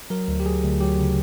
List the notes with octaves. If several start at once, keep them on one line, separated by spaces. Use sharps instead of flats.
F#3 A#4
D2
G4
F#3 G#4
D2
F#3 G4
C#3